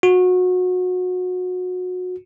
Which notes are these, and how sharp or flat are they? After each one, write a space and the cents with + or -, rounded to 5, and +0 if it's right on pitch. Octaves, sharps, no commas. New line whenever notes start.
F#4 -25